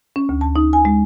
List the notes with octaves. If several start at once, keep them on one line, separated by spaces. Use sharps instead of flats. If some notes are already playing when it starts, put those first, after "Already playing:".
C#4
D2
A5
D#4
G#5
G#3